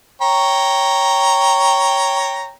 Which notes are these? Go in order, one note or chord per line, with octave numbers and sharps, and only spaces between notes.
C#5 G5 A#5